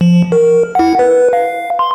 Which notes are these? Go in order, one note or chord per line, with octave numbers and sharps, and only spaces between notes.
F3
A#4
E4 F#5
B4
F5
C6